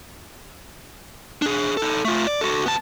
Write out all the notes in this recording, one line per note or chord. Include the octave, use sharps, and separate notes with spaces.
D4 G#4
D#4 A4
A3 F4
D5
F#4 A4
B3 A5